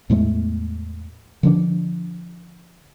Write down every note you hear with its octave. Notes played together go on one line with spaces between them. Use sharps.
E2 A2 G#3 A3
D3 F3 B3 D4